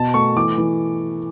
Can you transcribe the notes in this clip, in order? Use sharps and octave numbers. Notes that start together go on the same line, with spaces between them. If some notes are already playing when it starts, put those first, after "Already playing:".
Already playing: B2 A5
A3 C#6
E3 D6
E3